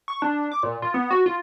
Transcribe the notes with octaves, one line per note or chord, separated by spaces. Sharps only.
C#6
D4
D6
A#2
F4
B3
F#4
F4